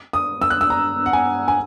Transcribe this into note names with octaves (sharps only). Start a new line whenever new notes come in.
D#6
E6
F#6
E6
A#5
F#5
G#5
G#5